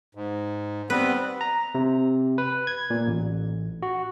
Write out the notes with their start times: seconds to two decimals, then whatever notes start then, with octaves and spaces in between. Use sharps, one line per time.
0.15 G#2
0.90 G3 B3 C4 B4
1.41 A#5
1.75 C3
2.38 B4
2.67 G#6
2.90 A#2
3.07 A1
3.82 F#4